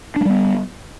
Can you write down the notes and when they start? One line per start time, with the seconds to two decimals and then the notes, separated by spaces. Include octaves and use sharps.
0.16 D4
0.21 G#3
0.25 G3
0.30 B3